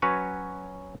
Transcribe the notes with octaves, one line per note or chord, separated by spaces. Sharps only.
F#3 C#4 F#4 B4 C#5